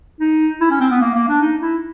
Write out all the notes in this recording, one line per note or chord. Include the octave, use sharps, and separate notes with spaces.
D#4
E4
C#4
C4
B3
A#3
A#3
D4
D#4
E4